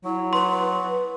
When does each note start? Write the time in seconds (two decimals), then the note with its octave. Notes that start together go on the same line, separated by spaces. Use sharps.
0.05 F#3 E4
0.33 B4 C6